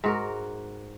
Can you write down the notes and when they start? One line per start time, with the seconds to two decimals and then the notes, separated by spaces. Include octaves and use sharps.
0.04 G#2 F#4 A#4